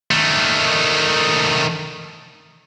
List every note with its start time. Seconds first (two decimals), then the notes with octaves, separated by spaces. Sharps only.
0.11 D#3 A3